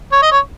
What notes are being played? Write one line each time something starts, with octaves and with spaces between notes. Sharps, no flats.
C#5
D#5
C#5